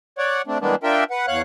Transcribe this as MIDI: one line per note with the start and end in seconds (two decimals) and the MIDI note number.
0.18 0.42 73
0.18 0.42 74
0.18 0.42 78
0.47 0.58 57
0.47 0.58 60
0.47 0.58 62
0.61 0.75 52
0.61 0.75 55
0.61 0.75 56
0.61 0.75 58
0.61 0.75 59
0.61 0.75 62
0.83 1.04 62
0.83 1.04 65
0.83 1.04 70
0.83 1.04 76
0.83 1.04 79
1.11 1.26 71
1.11 1.26 78
1.28 1.42 40
1.28 1.42 73
1.28 1.42 77
1.28 1.42 78
1.28 1.42 90